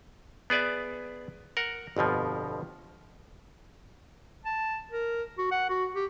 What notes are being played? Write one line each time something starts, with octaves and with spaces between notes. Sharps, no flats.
B3 G#4 D5 E5
A#4 F#5
G1 F2 B2 F3
A5
A#4
F#4
F#5
F#4
G4